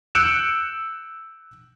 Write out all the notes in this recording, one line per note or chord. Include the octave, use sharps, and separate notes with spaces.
E6 F#6 G6 C#7 D7 E7